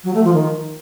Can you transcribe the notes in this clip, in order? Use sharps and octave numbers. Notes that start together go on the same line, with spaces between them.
F#3
A3
F3
D#3